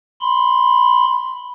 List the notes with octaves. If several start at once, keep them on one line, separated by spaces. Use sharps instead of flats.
B5 C6